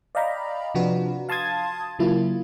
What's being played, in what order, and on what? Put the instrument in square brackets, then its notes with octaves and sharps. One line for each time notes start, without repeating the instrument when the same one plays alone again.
[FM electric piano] D5 D#5 F5 G5 A#5 B5
C3 F3 D4 F#4 B4
F5 A5 C6 D#6 G#6 A6
C#3 F#3 A#3 E4 F4